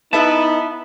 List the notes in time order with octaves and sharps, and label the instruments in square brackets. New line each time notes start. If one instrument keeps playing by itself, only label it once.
[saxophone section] B3 [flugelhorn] D#4 [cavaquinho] E4 B4 E5 [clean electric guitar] A5